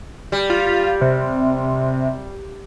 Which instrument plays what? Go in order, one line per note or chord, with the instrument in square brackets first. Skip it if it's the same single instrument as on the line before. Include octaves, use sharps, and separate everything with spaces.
[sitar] G3
[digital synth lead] F4
C3